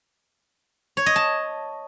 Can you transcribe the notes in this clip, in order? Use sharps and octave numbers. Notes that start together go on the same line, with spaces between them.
C#5
D#5
A5